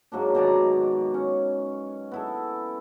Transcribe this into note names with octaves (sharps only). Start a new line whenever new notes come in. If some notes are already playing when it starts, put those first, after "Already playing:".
G#2 F#3 A#3 D4
B2 D#3 D5 A#5
C#4
B3 E4 A4